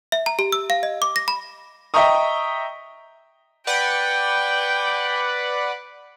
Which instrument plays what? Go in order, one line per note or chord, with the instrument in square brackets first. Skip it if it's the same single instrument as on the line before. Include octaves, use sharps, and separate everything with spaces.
[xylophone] E5
A#5
G4
E6
F5
D#5
D6
A#6
B5
[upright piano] D#5 E5 G5 A#5 C#6 D#6
[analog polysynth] B4 D5 F#5 [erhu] G5